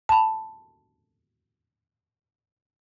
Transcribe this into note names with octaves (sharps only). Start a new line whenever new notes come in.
A5 B5